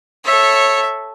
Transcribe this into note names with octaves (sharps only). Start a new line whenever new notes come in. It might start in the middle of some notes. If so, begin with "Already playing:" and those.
A4 C#5 E5